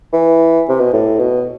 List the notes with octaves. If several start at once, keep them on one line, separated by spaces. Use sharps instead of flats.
E3
C3
B2
A2
B2